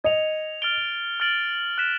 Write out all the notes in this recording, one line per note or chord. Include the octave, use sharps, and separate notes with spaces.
D#5 G#6 C#7 F7
F6 A6 D7 G7
F6 A6 D7 F#7
F#6 B6 E7